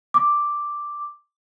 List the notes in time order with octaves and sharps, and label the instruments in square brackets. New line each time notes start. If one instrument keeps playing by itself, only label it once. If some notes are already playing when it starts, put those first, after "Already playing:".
[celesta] D6